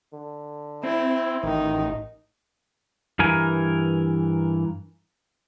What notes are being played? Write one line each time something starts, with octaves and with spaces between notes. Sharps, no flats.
D3
C4 E4
A1 D#3 D#4
G2 E3 A#4 G#5